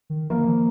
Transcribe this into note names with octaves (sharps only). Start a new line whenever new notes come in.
D#3
F3 A#3
D#3
F3